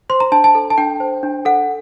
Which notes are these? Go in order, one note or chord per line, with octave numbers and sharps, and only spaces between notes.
C5 C6
A#5
D4 A5
A5
A4
A5
D4 G5
C5
D4
A4 F#5